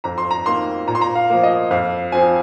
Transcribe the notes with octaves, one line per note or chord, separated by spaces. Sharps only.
F2 A#5
C6
A#5
D#3 A#3 C6
A#2 A#5
C6
A#5
F5
F3 A#3
D#5
F2 F5
F3 C4 G#5